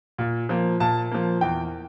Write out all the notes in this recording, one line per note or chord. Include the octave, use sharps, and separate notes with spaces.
A#2
F3 A#3
A#2 A5
F3 A#3
E2 G5